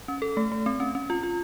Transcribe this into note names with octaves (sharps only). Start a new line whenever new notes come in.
C#4
A4
A3
A3
C4
C#4
C#4
F4
F4